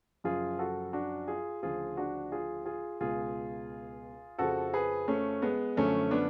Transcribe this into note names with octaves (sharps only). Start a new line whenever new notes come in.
F#2 C#3 F3 F4 G#4
F#4 A4
D4 F#4
F4 G#4
D2 C#3 F3 F4 G#4
D4 F#4
F4 G#4
F4 G#4
C#2 B2 F4 G#4
F2 C#3 F3 F#4 A4
G#4 B4
A3 C#4
G#3 B3
F#2 D3 F3 A3 C#4
B3 D4